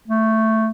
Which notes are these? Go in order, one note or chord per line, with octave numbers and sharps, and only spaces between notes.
A3